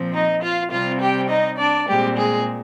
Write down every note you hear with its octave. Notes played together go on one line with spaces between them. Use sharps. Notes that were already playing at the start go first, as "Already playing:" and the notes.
Already playing: A#2 F3 C4
D#4 D#5
F4 F5
C3 G3 C4 F4 F5
G4 G5
D#4 D#5
D4 D5
A#2 G3 G#3 C4 G4
G#3 G#4